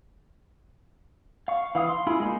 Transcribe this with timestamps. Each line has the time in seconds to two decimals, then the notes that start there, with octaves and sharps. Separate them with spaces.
1.48 F5 C#6
1.75 E3 F5 D#6
1.89 C6
2.07 E4 F4 G#4
2.20 G#3 A#3 D#4